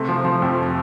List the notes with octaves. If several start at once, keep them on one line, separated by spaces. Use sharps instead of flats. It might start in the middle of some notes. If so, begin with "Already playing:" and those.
Already playing: C3 A3
F3
F3
F2